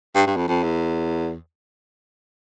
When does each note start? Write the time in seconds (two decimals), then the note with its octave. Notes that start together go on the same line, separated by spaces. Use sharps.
0.15 G2
0.27 G2
0.36 F2
0.48 F2
0.63 E2